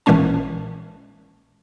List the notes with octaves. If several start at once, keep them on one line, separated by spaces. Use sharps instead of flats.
A#1 A#2 E3 G#3 C#4 A5